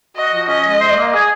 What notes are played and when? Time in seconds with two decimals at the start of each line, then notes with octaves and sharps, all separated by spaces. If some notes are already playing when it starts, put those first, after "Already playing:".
0.17 F#4 D#5
0.33 F3
0.48 C#4 D#5
0.65 G#3
0.81 C5
0.97 A#3
1.13 G#4